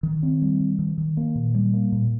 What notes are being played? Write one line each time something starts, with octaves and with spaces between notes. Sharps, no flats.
D#3
C4
G3
D#3
D#3
D#3
A#3
A#2
G3
A#3
A#2